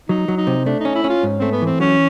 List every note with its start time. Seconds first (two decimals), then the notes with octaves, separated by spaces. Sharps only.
0.09 F#3 D#4
0.28 F#3
0.38 D#4
0.47 C3
0.66 A3 D4
0.80 C#4 D#4
0.95 E4
1.04 C#4
1.09 F4
1.23 G#2
1.38 A3 C4
1.51 B3
1.62 E3 C4
1.80 F#3 C#4